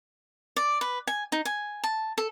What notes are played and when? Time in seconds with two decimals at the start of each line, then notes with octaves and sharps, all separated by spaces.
0.56 D5
0.81 B4
1.07 G#5
1.32 D#4
1.45 G#5
1.84 A5
2.18 A4